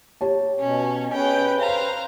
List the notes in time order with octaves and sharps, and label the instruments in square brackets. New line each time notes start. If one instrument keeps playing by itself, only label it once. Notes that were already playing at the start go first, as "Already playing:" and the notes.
[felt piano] G4 C#5 A5
[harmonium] B2 [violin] C#4
[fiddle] C#4 G#4 [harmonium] B4 [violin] G5
[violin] C5 [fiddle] F5 A#5